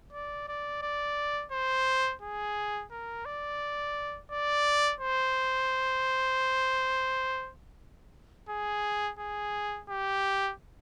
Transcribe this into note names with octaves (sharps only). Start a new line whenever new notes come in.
D5
D5
D5
C5
G#4
A#4
D5
D5
C5
G#4
G#4
G4